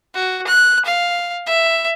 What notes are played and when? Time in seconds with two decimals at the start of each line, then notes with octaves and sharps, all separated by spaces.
0.14 F#4
0.47 F#6
0.86 F5
1.47 E5